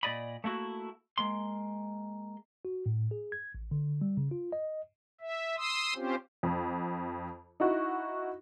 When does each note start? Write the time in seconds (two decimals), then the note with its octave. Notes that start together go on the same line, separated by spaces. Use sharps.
0.03 A#2 D5 D#5 B5
0.44 A3 A#3 E4 F#4
1.18 G#3 A#3 C6
2.65 F#4
2.86 A2
3.11 G#4
3.32 G#6
3.55 A1
3.71 D3
4.01 G3
4.17 C#3
4.31 F4
4.52 D#5
5.21 E5
5.57 C6 D#6 E6
5.95 C4 C#4 F4 G4 C5
6.43 F2
7.60 D#4 E4 F#4